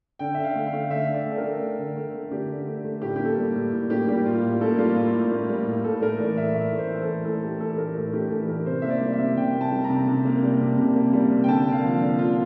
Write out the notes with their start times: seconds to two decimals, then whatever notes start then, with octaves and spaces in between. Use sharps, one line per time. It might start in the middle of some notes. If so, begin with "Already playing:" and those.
0.19 D3 G5
0.35 D3 E5
0.44 F5
0.55 A3
0.67 F5
0.73 A3
0.90 D3 E5
1.08 D3
1.14 D5
1.26 A3
1.31 A4
1.38 A#4
1.43 A3
1.60 D3
1.79 D3
1.96 A3
2.14 A3
2.31 D3 G4
2.49 D3
2.67 A3
2.84 A3
3.02 A2 G4
3.16 A#3 G4
3.25 A4
3.38 G3
3.55 A2
3.72 A2
3.90 A#3 G4
4.07 G3 G4
4.26 A2 F4
4.44 A2
4.61 A#3 A4
4.78 G3 F4
4.95 A2 F4
5.14 A2
5.32 A#3
5.49 G3
5.66 A2
5.84 A2 A4
6.01 A3 A#4
6.19 E3 D5
6.37 A2 E5
6.54 A2 E5
6.73 A3
6.78 C5
6.90 E3
7.02 A4
7.08 A2
7.25 A2 A4
7.43 A3 G4
7.61 E3 A4
7.78 A2 A#4
7.96 A2 A4
8.13 A3 G4
8.31 E3 A4
8.49 A2 A#4
8.66 C3 C5
8.82 A#3 E5
8.90 D5
9.01 G3
9.13 E5
9.20 C3
9.37 C3 G5
9.55 A#3
9.61 A5
9.72 G3
9.84 A#5
9.90 C3
10.08 C3
10.25 A#3
10.43 G3
10.61 C3
10.78 C3
10.96 A#3
11.13 G3
11.31 C3
11.44 G5
11.48 D3 A5
11.66 A#3
11.72 F5
11.84 F3
12.02 D3
12.19 D3 F4